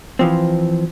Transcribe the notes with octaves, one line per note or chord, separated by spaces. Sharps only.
E3 F3 C4